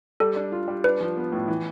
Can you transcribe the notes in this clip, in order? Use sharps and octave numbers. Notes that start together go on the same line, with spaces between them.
G3 A4
D4
F4
G3
D4 B4
F3
B3
A2
E3